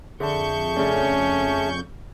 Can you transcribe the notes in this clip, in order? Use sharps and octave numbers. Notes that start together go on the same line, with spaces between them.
F2 D3 G#4 E5 A5 C#6 G6
C#3 A3 C#4 D4